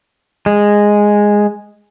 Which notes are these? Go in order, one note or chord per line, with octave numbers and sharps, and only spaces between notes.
G#3